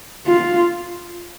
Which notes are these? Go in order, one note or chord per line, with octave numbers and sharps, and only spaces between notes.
F4